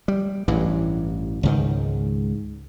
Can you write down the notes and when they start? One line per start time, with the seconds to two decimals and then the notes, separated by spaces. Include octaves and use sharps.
0.08 G3
0.48 A1 G2 E3
1.43 C#2 G#2 D#3